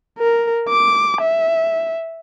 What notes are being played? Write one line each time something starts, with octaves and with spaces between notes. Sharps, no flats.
A#4
D6
E5